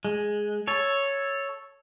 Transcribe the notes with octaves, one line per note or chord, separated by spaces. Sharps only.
G#3
A4 C#5